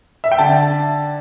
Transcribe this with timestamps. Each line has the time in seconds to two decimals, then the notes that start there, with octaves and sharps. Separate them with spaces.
0.24 E5
0.32 G5
0.39 D3 A5